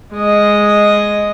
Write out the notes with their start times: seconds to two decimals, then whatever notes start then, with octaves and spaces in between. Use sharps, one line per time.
0.13 G#3 D#5